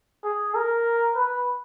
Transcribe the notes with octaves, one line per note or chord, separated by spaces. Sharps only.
G#4
A#4
B4